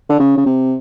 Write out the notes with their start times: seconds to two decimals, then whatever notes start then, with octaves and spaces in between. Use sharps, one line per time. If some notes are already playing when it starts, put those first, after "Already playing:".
0.10 D3
0.19 C#3
0.38 C#3
0.46 C3